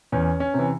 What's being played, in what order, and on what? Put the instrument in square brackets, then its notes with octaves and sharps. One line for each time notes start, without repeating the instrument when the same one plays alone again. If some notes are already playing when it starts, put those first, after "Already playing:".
[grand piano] E2 C#4
C#4
C3 E3